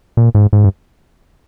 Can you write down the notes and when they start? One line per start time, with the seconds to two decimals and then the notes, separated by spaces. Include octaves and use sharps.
0.17 A#2
0.35 G#2
0.53 G#2
0.64 G2